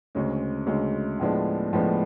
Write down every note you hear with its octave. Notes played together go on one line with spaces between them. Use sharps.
D2 C#3 G#3 C#4
D2 C#3 G#3 C#4
A2 F3 G#3 B3 D4
A2 F3 G#3 B3 D4